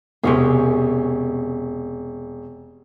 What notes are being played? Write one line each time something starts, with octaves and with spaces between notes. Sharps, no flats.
E1 C3 C#4 G#4